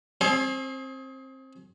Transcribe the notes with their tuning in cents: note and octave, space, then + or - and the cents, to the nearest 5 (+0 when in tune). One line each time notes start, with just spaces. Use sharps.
C4 +20 G#4 +25 C#5 -40